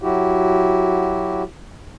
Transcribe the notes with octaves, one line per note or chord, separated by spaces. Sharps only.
F#3 E4 F#4 G4